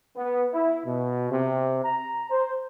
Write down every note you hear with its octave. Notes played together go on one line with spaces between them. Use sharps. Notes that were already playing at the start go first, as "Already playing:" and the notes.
B3
E4
B2
C3
A#5
C5